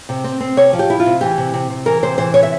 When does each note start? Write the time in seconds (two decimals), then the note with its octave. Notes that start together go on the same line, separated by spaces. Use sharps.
0.09 C3
0.24 C4
0.40 C4
0.57 C3 C#5
0.73 F3
0.79 G4
0.90 E4
1.00 F4
1.06 C3
1.21 E3 G4
1.38 C3
1.54 C3
1.70 C3
1.86 E3 A#4
2.03 C3 C5
2.18 E3 C5
2.34 C3 C#5
2.43 E5